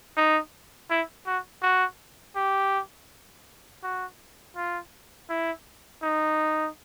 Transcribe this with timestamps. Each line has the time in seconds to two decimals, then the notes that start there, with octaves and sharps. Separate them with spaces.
0.16 D#4
0.90 E4
1.27 F#4
1.62 F#4
2.36 G4
3.83 F#4
4.56 F4
5.29 E4
6.03 D#4